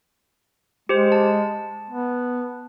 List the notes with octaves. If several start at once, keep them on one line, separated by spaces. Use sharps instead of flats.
G#3 G4 C5
A5
B3